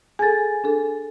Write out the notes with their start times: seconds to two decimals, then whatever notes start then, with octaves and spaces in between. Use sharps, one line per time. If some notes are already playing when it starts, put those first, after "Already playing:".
0.19 G#4 A4 G#5 A6
0.64 D4 G#4 A4